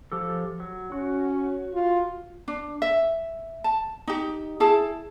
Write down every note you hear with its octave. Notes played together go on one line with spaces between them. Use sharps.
F3 G4 A4
F#3
C#4 F#4
F4
D4
E5
A5
D#4 G4
E4 G#4 A5